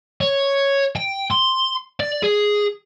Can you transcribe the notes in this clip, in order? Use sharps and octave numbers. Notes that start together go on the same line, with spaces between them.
C#5
G5
C6
D5
G#4